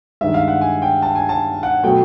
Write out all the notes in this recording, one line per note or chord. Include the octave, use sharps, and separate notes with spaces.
G2 D#3 G#3 E5
F5
F#5
G#5
G5
A5
G#5
A5
F#5
B2 F#3 A3 G5